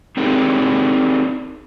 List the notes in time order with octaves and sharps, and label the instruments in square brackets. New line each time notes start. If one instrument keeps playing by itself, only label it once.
[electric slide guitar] C4 D4 D#4 G4 G#4 A#4